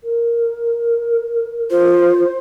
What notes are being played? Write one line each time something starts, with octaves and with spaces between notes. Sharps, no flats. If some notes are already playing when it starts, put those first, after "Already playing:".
A#4
F4 C5